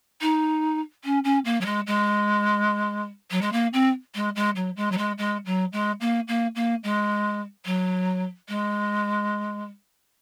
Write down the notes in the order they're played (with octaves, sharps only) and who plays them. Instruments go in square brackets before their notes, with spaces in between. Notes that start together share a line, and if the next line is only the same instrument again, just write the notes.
[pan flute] D#4
C#4
C#4
A#3
F#3
G#3
G#3
F#3
G#3
A#3
C4
G#3
G#3
F#3
G#3
F#3
G#3
G#3
F#3
G#3
A#3
A#3
A#3
G#3
F#3
G#3